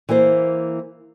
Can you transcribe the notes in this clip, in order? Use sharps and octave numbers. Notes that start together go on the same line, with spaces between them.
E3 A#3 E4 C5